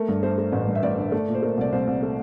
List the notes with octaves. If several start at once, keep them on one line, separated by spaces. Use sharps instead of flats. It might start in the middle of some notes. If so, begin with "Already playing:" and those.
Already playing: A3 A#4
G2
A3 C5
A3
A1
G2
E5
A1 D5
D3
A3
A#2
C5
A3 A#4
C2 D5
C2 C5
C2
A3